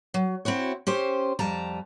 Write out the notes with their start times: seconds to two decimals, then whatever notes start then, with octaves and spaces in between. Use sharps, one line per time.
0.14 F#3
0.45 C4 E4 F#4 C#5
0.87 C#4 G4 C5
1.39 F2 G3 A5 A#5